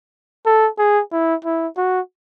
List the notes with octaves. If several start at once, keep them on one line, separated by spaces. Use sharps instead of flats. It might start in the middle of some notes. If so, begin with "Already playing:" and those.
A4
G#4
E4
E4
F#4